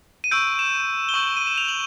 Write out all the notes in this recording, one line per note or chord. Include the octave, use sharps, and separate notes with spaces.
D#7
C#6 E6 G6 D7
E7
G7
C#6 E6 G6 F#7
D#7
E7
F7
F#7